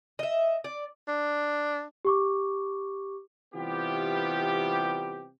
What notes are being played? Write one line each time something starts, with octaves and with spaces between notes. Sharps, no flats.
D#5 E5
D5
D4
G4 C#6 D6
C3 E3 G3 B3 F4 G4